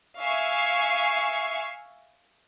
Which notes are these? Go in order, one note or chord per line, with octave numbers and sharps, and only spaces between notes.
E5 F5 G#5 C#6 C7